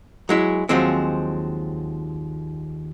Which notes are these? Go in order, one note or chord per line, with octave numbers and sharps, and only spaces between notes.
F#3 G#3 E4
D#2 F3 F#3 G#3 C4